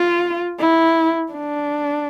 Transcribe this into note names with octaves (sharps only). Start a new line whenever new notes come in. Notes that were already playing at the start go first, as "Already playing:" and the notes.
Already playing: F4
E4
D4